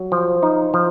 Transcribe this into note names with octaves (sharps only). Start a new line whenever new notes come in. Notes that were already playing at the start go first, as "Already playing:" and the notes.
Already playing: F#3
F3
D#4
F3